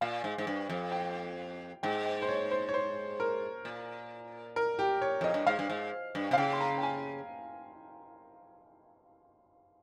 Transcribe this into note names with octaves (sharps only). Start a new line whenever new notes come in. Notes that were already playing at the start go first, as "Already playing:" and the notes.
A#2 F5
G#2
G#2
G2
F2
G5
G#2 G5
G5
C5
C#5
C5
C#5
C5
A#4
A#2
A#4
G4
C#5
F2 D#5
G2
G#2 F5
G2
G#2
G2
C3 F5
C#3 G5
C6
A#5
G5
G#5